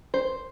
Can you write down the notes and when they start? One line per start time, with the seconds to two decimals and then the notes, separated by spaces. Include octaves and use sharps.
0.14 C5